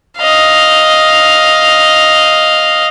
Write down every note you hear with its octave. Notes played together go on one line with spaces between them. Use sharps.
D#5 F5